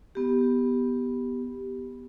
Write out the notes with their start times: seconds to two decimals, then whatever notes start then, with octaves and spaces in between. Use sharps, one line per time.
0.15 B3 G4